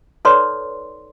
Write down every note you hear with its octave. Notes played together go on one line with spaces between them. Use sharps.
D#4 A4 B4 C#5 D5 C6